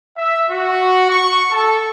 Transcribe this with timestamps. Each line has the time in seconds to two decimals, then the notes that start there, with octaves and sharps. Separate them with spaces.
0.17 E5
0.51 F#4
1.09 C#6
1.51 A4